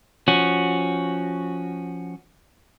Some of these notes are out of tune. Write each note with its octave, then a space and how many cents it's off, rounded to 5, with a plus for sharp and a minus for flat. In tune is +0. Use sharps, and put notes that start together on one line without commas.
F3 +0 C#4 +0 F#4 +0